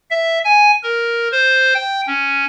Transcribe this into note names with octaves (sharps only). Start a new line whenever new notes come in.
E5
G#5
A#4
C5
G5
C#4